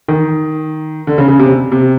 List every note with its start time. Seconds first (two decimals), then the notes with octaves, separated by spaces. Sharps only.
0.08 D#3
1.07 D3
1.18 C#3
1.28 C#3
1.39 C3
1.72 C3